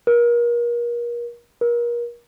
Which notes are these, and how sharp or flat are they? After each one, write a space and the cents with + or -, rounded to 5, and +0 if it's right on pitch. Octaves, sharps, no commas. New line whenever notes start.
A#4 +35
A#4 +35